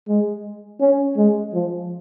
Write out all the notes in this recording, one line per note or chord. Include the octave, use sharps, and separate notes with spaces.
G#3
C#4
G#3
F3